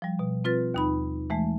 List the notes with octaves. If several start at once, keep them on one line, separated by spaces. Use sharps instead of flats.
F3 G3
B2
C4 F4 B4 A6
D#2 D#4 B5
E3 G#3 A3